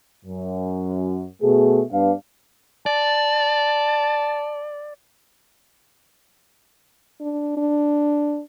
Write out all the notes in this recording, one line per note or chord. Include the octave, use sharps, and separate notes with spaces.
F#2
B2 A3 G#4
G2 B3 D4 B4 F5
D5 A5
D4
D4